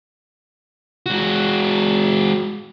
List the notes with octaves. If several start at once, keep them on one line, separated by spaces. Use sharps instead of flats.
G#3 F#4